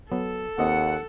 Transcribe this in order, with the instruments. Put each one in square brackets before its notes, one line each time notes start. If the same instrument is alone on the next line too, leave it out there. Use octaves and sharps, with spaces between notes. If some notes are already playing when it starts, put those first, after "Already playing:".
[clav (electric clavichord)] F#3 B3 [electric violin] A4
[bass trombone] D#2 [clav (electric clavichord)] A#3 C4 D#5 [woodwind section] F#5